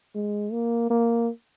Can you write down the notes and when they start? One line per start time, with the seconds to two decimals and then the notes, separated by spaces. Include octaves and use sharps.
0.15 G#3
0.52 A#3
0.90 A#3